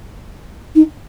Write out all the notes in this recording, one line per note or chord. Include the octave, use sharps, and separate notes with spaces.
D#4